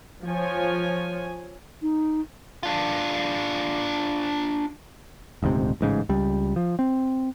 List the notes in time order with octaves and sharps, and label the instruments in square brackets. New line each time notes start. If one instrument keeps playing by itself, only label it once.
[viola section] F3 F4 C#5 G#5
[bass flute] D#4
[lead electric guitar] D4 F4
[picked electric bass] D#1 D2 G#2 C3
A1 G#2 C#3
C#2 G3
F3
C4